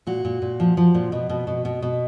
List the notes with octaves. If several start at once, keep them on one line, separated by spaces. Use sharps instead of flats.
A#2 F#4
A#2
A#2
F3
F3
A#2
B2
B2
B2
B2
B2